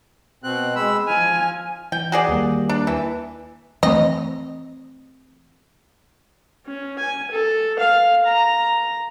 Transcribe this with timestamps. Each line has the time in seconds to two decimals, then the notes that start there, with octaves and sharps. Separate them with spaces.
0.44 B2 C4 F#6
0.76 G#3 B5 E6
1.07 F3 G#5 F6
1.92 E3 G5
2.12 F#4 G#4 D5
2.29 D#2 G3 A#3
2.69 D4
2.87 E3
3.83 E3 A3 C4 D#5
6.66 C#4
6.98 G#5
7.31 A4
7.79 F5
8.26 A#5